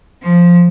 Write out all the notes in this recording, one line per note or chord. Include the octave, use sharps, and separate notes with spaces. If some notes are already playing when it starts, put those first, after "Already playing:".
F3